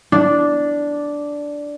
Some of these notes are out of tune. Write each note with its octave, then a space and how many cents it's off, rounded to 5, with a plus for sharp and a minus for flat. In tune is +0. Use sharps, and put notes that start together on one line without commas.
D4 -5